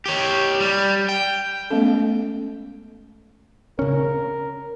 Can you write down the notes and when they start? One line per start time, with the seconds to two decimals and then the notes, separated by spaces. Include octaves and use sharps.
0.06 G4 C#5
0.60 G3
1.09 G5
1.70 G#3 A3 B3 C#4 A4
3.79 C#3 C#4 A#4